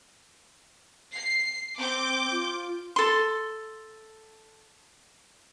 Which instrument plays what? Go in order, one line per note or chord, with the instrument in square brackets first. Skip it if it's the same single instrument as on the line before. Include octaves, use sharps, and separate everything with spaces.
[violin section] C7
[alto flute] C4 [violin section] D6 G6
[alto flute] F4
[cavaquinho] A4 C6